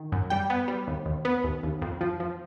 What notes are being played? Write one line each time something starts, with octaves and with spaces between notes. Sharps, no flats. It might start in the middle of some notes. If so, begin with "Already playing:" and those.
Already playing: D#3
F#2
G3 G5
B3
G3
D#2
D#2
B3
D#2
D#2
F2
F3
F3